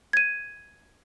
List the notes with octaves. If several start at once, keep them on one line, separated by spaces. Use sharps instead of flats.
G#6 D#7